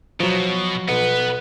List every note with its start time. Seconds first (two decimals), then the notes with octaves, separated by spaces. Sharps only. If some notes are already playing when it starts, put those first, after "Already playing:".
0.20 B2 F3 F#3
0.89 B1 B2 B3 B4